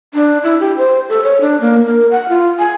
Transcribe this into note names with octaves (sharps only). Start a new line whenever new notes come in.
D4
E4
G4
C5
A4
C#5
D4
A#3
A#4
F#5
F4
G#5